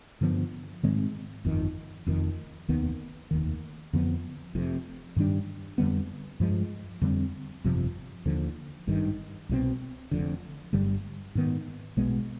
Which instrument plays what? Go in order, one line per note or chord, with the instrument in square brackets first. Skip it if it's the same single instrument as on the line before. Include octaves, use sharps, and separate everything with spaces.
[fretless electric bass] G2 D3 F3 B3
G#2 D#3 G#3 C4
G1 F2 D#3
F1 F2 D#3
F1 D#2 D#3 B3
F1 D#2 D#3
F2 D3 F3 B3
F1 F2 C3
G2 D#3 G3 D4
F2 D3 G3 B3
G2 F3 G#3
F2 D3 G3 C4
G1 F2 C3 F3
D#2 D3 F3
G#1 G2 D#3
C2 B2 G#3 C4
F1 F2 D3
G1 G2 D3 G3
G#2 D#3 B3
B1 B2 G#3 B3